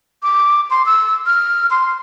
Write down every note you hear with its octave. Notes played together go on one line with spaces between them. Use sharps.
D6
C6
E6
F6
C6